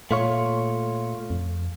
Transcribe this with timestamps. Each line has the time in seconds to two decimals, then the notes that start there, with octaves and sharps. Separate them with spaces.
0.11 A#2 A3 F4 C#5
1.30 F2